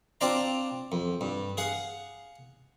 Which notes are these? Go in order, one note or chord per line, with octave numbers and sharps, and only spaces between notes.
C4 D4 F4 D5 F5 A#5
F2
G2
G#4 F5 F#5